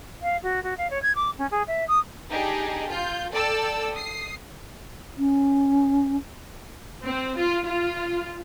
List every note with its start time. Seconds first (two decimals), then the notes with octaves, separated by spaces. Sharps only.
0.22 F5
0.43 F#4
0.63 F#4
0.77 F5
0.90 C#5
1.02 G#6
1.15 D6
1.38 C#4
1.51 G#4
1.67 E5
1.88 D#6
2.31 D4 D#4 G4 G#4
2.89 F4 G6
3.31 A4 D5 G5 A5 E6
3.93 D#6 C7
5.18 C#4
7.03 C4
7.37 F4
7.66 F4